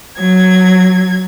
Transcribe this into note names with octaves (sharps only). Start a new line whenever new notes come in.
F#3 G#6